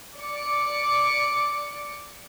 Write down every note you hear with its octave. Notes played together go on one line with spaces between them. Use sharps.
D5 D6 C#7